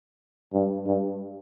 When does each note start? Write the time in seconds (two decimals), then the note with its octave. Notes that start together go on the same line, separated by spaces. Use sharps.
0.53 G2
0.86 G2